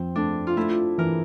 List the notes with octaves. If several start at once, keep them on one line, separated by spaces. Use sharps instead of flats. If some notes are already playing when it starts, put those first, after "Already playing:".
Already playing: F2 C4
A3 D4
F4
A3 E4
E3 A#4